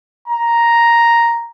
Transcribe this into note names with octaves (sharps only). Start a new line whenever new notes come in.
A#5